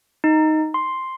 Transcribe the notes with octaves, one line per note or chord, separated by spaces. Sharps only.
D#4
C6